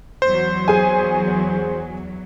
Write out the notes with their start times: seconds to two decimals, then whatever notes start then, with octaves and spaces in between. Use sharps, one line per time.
0.22 E2 F#3 C5
0.68 G#4 G#5